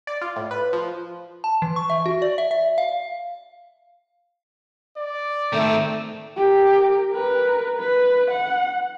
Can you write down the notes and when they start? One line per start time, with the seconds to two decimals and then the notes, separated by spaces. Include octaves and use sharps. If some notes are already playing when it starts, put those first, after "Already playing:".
0.07 D5
0.22 F4
0.36 A2
0.51 B4
0.73 F3
1.44 A5
1.62 E3
1.76 C#6
1.90 E5
2.06 F#4
2.22 D5
2.38 E5
2.51 E5
2.78 F5
4.97 D5
5.53 D#3 A3 C4
6.37 G4 A#4
7.14 A#4 B4
7.79 B4
8.31 F#5